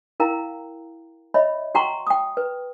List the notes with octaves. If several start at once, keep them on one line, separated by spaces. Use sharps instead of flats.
E4 A#4 F5 G5 A#5
C#5 D#5 E5 B5
F#4 F#5 G5 A#5 C6 C#6
G5 D#6
B4